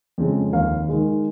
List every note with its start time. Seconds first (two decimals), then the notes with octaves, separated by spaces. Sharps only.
0.18 F2 C#3 G#3
0.53 D#2 F5
0.89 D#3 G#3